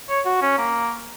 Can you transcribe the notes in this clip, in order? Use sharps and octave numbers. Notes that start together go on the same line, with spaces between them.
C#5
F#4
C#4
A#3